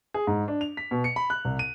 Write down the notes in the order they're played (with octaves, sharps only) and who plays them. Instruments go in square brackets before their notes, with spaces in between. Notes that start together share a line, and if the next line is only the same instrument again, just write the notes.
[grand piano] G#4
G#2
D4
F7
B6
B2
C#7
B5
F#6
C2
D#7